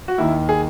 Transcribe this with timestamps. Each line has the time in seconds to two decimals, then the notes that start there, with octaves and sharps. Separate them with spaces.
0.08 F#4
0.18 D#2 D#3 E4
0.49 G#4